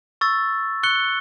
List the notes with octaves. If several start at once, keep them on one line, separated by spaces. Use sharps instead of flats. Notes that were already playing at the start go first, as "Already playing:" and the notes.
C#6 E6 A6
C#6 F#6 C#7 G7